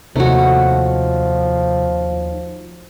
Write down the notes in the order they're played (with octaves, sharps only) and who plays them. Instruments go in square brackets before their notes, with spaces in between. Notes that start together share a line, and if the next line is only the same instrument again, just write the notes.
[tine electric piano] D#2 D#4 C#5 [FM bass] C3 [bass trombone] F3 [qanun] A3 F#4